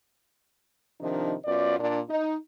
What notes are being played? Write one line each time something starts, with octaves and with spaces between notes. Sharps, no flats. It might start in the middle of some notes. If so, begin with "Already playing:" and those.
C3 D#3 F3 D4 D#4
F#2 B3 F4 D5
A#2 D4
D#4